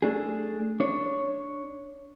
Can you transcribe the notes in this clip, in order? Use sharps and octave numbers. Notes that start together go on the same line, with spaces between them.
A3 D4 G#4
D4 C#5